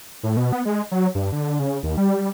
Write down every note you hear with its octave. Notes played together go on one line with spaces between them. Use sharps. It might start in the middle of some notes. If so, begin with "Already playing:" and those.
A2
B2
B3
G#3
F#3
G2
D3
C#3
D#2
G3